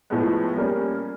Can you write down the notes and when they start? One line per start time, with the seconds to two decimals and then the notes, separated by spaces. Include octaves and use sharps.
0.10 A2 F3 G#3 B3
0.57 G3 A#3 C#4